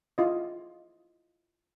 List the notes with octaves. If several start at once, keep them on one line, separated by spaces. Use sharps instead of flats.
E4 F4 D#5